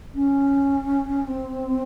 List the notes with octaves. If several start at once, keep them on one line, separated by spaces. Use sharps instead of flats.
C#4
C4